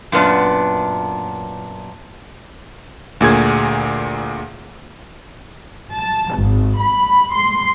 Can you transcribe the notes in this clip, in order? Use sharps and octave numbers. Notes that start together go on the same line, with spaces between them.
F#2 A#2 B3 D4
D2 A#2 G#4 G#6
A5
G#1
B5
C6